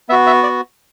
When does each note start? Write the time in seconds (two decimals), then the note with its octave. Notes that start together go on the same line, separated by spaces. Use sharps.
0.09 B3 E5
0.12 F#4
0.27 E5
0.43 D5